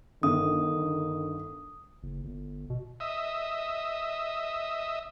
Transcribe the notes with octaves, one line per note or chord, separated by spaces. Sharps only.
G1 D#3 D#6
F#1
G1
B2
D#5 E5